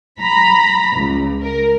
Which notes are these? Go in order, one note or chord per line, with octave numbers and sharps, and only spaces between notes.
A#5 B5
C#2
A#4